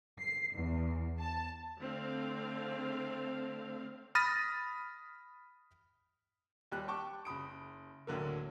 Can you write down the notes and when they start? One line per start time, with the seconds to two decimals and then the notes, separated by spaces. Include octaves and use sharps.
0.20 C7
0.55 E2
1.20 A5
1.80 D3 A3 C4 F5
4.15 B5 D#6 F6 A6 A#6 D#7
6.72 D#2 G3 F#6
6.88 G5 A5 C#6 D6
7.25 F#1 B5 D#6 D7
8.07 D2 A2 D3 F#3 A#3